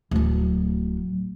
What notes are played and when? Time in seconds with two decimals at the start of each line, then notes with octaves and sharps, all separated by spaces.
0.11 D1 F#3